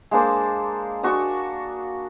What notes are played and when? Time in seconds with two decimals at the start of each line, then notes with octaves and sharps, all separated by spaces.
0.11 G#3 A#3 D4 C5
1.03 D4 F#4 C#6 D#6